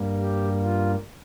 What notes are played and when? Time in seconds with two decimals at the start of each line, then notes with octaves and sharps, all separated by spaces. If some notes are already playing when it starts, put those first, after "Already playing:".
Already playing: G2 G3 A#3
0.19 G4
0.61 F4